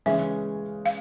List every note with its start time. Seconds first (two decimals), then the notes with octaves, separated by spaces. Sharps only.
0.06 C#3 E3 G#3 C#4 E5
0.86 F5